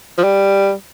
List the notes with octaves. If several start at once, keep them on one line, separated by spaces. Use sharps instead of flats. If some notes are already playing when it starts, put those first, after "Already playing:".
F3
G3